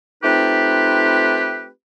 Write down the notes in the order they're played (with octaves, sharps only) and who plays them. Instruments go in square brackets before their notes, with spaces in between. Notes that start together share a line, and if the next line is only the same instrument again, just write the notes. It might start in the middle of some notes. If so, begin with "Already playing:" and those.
[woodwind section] A3 C4 D#4 F4 G4 B4